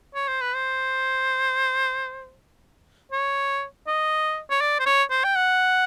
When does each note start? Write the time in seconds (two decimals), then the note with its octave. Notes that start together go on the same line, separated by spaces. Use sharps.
0.15 C#5
0.28 C5
0.41 B4
0.54 C5
3.12 C#5
3.87 D#5
4.50 C#5
4.61 D5
4.80 C5
4.86 C#5
5.11 C5
5.24 G5
5.35 F#5